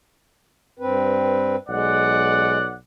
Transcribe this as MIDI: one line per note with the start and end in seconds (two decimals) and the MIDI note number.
0.79 1.56 43
0.79 1.56 60
0.79 1.56 71
1.69 2.76 35
1.69 2.57 56
1.69 2.76 74
1.69 2.76 78